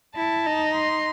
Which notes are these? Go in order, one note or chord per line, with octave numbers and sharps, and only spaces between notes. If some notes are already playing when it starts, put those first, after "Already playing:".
E4 A5
D#4
C6